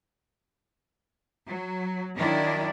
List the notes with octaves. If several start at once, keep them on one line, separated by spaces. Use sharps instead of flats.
F#3
D#3 F#3 D4 E4